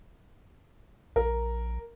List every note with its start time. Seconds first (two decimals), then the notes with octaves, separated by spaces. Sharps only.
1.16 A#1 A#4